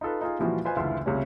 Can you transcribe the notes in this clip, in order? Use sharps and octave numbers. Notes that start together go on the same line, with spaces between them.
D#4 F4 A4 B4
D#4 F4 G#4
A#2 E3 F3 G3 F4 F#4
F4 B4 C5 D#5 G#5
F#1 D2 E3 F4 E5 C6
C#2 C3 G3 A3 C#4